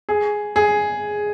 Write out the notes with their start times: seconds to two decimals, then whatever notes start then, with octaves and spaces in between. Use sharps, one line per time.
0.09 G#4
0.56 G#4